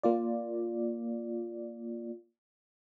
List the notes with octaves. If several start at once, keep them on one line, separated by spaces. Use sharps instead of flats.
A#3 F4 D5